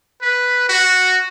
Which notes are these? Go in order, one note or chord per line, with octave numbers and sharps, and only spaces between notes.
B4
F#4